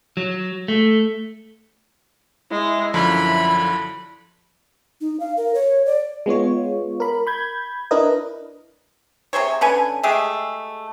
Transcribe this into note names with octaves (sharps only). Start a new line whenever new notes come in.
F#3
A3
G#3 E4
F#2 D3 F3 B5
D#4
F5
A#4
C#5
D5
G#3 B3 F4 C#5
A#4 B5
B5 G6 G#6
D4 E4 A#4 B4 D#5
C3 G#4 C5 C#5
D3 C#4 B4 G#5
G#3 A3 G4 G#4